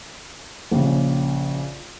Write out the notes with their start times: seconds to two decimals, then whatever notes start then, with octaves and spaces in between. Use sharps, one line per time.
0.71 A#1 C#3